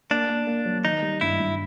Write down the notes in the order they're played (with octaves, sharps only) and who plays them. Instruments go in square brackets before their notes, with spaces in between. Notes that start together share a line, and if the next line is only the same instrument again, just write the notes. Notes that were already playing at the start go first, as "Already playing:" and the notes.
[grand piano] A#3 [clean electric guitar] D4
[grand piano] A#3
A#3
F#3
[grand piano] D#3 [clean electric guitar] D#4
[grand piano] G3
[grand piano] G2 [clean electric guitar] E4
[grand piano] G2